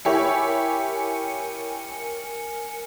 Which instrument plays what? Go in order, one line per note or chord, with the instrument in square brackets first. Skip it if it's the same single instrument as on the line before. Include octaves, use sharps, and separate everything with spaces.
[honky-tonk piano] E4 G4 C#5 [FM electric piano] A#4 G#5 C#7